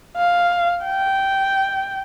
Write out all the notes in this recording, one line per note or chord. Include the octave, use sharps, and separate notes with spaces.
F5
G5